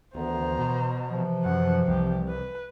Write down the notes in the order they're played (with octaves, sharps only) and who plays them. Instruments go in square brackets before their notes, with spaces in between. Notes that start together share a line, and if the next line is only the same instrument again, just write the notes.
[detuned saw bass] D2 [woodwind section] D#3 E3 B3 [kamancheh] C5 A#5
[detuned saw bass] B2
[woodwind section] C3 E3 F3
[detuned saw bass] F#2 [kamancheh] F#5
[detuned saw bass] C2 [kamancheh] G4
[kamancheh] B4